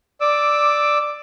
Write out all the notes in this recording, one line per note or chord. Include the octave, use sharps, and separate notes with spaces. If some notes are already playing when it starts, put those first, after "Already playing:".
D5 D6 E6